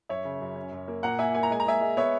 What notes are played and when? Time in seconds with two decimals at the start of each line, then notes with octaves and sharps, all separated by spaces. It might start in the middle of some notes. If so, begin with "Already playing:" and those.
0.09 F#2 C#5 E5
0.25 C#3
0.41 F#2
0.56 C#4
0.72 F#2
0.88 A#3
1.03 A#2 F#5 A#5
1.19 A#3 E5 G#5
1.34 A#3 G#5
1.43 A#5
1.50 G#3 G#5
1.60 A#5
1.66 G#3 E5 G#5
1.81 G#3
1.97 B3 C#5 E5